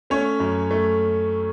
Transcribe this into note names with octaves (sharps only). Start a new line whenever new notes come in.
A3 C#4 C#5
F#2
A3